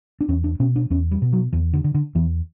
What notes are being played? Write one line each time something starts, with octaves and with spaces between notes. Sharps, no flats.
D4
E2 C#4
D4
B2 C#4
D4
E2 C#4
G3
B2
F#3
E2 E3
D3
D3
D3
E2 E3